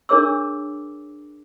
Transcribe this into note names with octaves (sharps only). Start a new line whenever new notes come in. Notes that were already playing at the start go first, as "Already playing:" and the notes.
D4 G#4 A#4 C#5 D6 E6